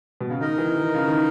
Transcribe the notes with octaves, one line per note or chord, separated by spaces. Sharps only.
B2
C#3
D#3 D#4 A#4 D#5
E3
D#3
C#3
D#3